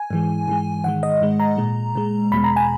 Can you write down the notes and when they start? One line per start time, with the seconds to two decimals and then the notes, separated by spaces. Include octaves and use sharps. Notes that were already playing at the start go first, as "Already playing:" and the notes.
Already playing: G#5
0.11 G#2 E3 G#3
0.48 G#2 E3 G#3
0.84 G#2 D#3 G#3 F#5
1.03 D#5
1.21 G#2 D#3 G#3
1.40 A#5
1.57 A#2 G#3
1.95 A#2 G#3
2.32 E2 B2 G#3 B5
2.44 A#5
2.56 G#5